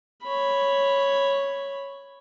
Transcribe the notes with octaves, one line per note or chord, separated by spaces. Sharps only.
C#5 B5